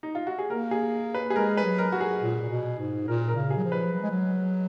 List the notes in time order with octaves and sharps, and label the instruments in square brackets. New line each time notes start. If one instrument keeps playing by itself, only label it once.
[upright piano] D#4
F4
F#4
G#4
[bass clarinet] A#3 [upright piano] A#4
[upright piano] G#4
B4
G#4
[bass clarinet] G#3 [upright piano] A#4
[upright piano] B4
[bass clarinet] F#3
[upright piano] A#4
F#4
G#4
[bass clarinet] A#2
A#2
B2
G#2
[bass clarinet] A#2 [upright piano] A#4
[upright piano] A#4
[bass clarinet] C#3
[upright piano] G#4
[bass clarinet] F#3
F3
[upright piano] B4
[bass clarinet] F#3
G#3
F#3